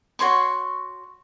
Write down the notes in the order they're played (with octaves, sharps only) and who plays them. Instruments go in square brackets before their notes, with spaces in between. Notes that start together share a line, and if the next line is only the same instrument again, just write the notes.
[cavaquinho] F#4 C#5 C6 C#6